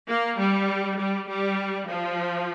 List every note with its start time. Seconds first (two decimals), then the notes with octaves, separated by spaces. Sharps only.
0.08 A#3
0.39 G3
0.99 G3
1.29 G3
1.89 F3